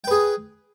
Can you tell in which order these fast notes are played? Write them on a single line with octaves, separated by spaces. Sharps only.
G5 B4 G#4